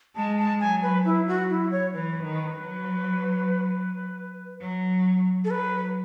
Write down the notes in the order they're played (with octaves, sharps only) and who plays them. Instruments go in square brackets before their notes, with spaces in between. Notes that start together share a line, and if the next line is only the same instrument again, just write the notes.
[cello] G#3 [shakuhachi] A5
[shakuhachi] A5
[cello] F#3 [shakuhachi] G#5
[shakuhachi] B4
[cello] F#3 [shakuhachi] E4
[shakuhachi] F#4
E4
C#5
[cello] E3 [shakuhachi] B4
[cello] D#3
F#3
F#3
[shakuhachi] A4
[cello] F#3 [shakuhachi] B4